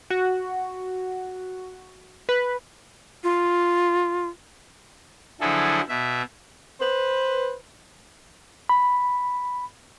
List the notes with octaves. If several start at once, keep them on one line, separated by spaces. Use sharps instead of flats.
F#4
B4
F4
D3 F3 F#3 E4 G#4 A4
B2 E5
B4 C5
B5